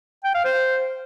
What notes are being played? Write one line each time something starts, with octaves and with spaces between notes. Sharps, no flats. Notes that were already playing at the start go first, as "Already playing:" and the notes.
G5
F5
C5